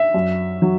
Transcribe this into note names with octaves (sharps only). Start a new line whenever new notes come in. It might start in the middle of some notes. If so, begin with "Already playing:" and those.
Already playing: E5
F#2
F#3